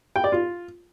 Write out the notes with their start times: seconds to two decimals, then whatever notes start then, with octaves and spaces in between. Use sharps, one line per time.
0.16 G5
0.24 D5
0.32 F4